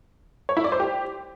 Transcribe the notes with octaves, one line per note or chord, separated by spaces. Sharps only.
C#5
E4
D5
C5
G4